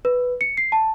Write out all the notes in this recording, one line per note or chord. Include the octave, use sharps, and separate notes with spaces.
B4
C#7
C7
A5